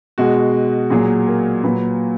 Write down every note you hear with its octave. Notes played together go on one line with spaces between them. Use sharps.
B2 G#3 F#4
A#2 F#3 G#4
A#4
A#2 F#3 B4